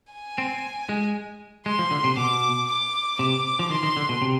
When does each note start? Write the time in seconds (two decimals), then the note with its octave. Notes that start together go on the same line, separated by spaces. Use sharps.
0.13 G#5
0.38 C4
0.89 G#3
1.66 G#3 C6
1.79 F3
1.91 D3
2.04 C3
2.17 B2 D6
2.68 D6
3.19 C3 D6
3.59 F3
3.70 D#3 C6
3.83 D#3
3.97 D3
4.09 B2
4.22 C3